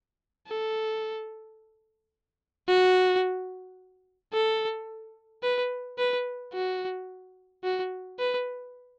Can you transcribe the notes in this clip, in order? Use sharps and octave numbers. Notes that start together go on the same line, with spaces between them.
A4
F#4
A4
B4
B4
F#4
F#4
B4